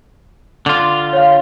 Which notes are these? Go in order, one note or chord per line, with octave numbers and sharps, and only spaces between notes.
D3 F4 D6
C#5 F5